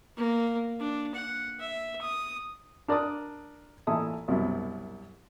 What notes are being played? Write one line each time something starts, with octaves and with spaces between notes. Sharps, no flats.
A#3
D4
F#5
E5
D#6
D4 A#4 D5 A5 D6 D#6
A1 A#2 E4 A4 D#6
C2 F#2 B2